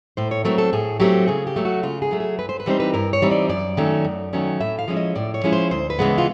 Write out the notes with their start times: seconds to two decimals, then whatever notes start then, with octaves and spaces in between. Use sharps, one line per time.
0.17 A2 C5
0.31 C#5
0.45 F#3 A3 C4 A#4
0.58 A4
0.73 A2 G#4
1.00 F#3 A3 C4 G4
1.28 C#3 G#4
1.47 G4
1.56 F#3 A3
1.65 F#4
1.83 C#3 F4
2.02 G#4
2.11 F#3 A3
2.20 G#4
2.39 G2 B4
2.49 C5
2.60 B4
2.66 E3 G3 C4 D#4 C5
2.80 B4
2.94 G2 A#4
3.13 C#5
3.22 E3 G3 C4 D#4
3.31 D5
3.49 F#2 D5
3.77 D#3 F#3 A3 C#4
4.05 F#2
4.33 D#3 F#3 A3 C#4
4.61 A2 E5
4.79 F5
4.88 F3 G#3 C#4 E4
4.97 D#5
5.15 A2 D5
5.34 C#5
5.44 F3 G#3 C#4 E4
5.53 C5
5.71 D2 C5
5.90 B4
5.99 C#3 E3 G#3 B3
6.18 F4